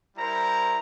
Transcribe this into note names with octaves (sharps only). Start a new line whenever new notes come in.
G3 E4 A#4 C5 A#5